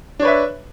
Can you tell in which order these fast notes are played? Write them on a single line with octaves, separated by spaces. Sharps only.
D4 C#5 B4 E5